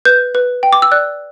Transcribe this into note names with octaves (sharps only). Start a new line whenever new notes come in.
B4 G6
B4
G5
D6
E6
D5 F#6